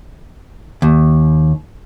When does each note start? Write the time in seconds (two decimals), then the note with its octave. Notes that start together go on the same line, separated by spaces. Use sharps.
0.82 D#2